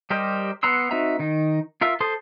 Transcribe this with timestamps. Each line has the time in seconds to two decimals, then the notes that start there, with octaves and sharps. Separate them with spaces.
0.10 G3 G4 A#4 C5 D#5
0.63 B3 F#5 A#5 C6 E6
0.91 C4 D#4 F#4 E5 A#5
1.19 D#3 D#4
1.81 F4 A#4 E5
2.00 A4 C5 C6 D#6